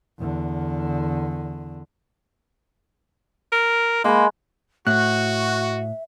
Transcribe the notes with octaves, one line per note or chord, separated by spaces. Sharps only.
E2 D3
A#4
G#3 A#3 B5
A2 F#4 E5 F#6